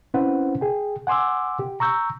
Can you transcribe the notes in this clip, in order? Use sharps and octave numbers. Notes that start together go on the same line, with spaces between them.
C4 C#4 E4 B4 C5 F#5
G#4 G5
F#5 G#5 C6 D6 E6
G4
A#5 C#6 E6 G6